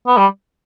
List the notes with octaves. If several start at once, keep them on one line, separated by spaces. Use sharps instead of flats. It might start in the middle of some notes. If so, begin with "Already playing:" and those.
B3
G3